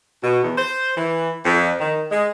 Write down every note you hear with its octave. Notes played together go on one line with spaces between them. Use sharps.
B2
E2
C5
E3
F2
D#3
G#3